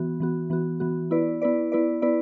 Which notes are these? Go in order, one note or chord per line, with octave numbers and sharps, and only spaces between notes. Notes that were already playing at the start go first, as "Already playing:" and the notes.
Already playing: E3 B3 F#4
E3 B3 F#4
E3 B3 F#4
E3 B3 F#4
B3 E4 B4 D5
B3 E4 B4 D5
B3 E4 B4 D5
B3 E4 B4 D5